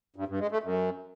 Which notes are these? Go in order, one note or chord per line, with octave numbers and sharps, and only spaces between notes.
G2
G2
G#3
A3
F#2